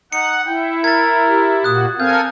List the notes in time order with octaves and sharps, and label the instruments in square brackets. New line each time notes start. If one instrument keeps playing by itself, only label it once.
[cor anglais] D#4 [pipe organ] F#5 [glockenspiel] C#7
[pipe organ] E4 [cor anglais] G5
[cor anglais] A#4 [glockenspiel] G#6 A6
[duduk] G4
[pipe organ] A#2 A#3 F#4 [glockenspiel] D#6 F#6
[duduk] C4 [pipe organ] A4 A#4 G#5 [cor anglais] F5 [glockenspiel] G6